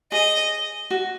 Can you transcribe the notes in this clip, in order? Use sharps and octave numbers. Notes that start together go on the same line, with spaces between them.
G#4 D#5
F#4